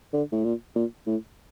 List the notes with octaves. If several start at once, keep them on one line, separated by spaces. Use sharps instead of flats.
D3
A2
A#2
A#2
A2